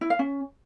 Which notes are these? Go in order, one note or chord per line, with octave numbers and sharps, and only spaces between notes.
E4
F5
C#4